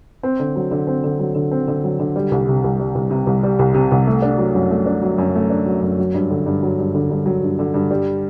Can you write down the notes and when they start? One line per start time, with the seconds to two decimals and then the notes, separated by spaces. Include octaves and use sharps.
0.23 C4
0.40 D3
0.56 F#3
0.71 D3
0.87 C4
1.04 D3
1.19 F#3
1.35 D3
1.51 C4
1.68 D3
1.84 F#3
2.00 D3
2.16 G3
2.31 C2
2.48 C3
2.64 C2
2.80 G3
2.95 C2
3.10 C3
3.27 C2
3.43 G3
3.59 C2
3.74 C3
3.91 C2
4.07 A3
4.22 D4
4.38 F#3
4.55 F#2
4.70 A3
4.86 D4
5.02 F#3
5.18 F#2
5.35 A3
5.50 D4
5.66 F#3
5.82 F#2
5.98 F#3
6.14 G2
6.31 D3
6.46 G2
6.63 F#3
6.79 G2
6.95 D3
7.10 G2
7.26 F#3
7.43 G2
7.59 D3
7.74 G2
7.91 G3